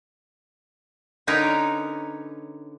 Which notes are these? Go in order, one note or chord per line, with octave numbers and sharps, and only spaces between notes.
D3 C#4 D#4 A#4 B4 C#5